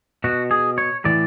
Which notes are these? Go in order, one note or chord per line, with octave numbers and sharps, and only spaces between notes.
B2 F#4
G#4
C#5
A2 E3 D5